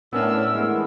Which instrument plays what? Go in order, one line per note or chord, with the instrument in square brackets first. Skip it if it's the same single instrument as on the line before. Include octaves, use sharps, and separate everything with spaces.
[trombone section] A2 [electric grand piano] B3 C#4 D4 [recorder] A#4 [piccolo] E6
[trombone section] E3 B3 [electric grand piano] G#3 A3